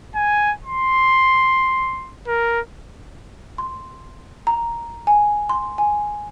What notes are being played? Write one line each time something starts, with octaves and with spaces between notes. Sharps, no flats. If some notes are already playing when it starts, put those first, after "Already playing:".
G#5
C6
A#4
C6
A#5
G#5
C6
G#5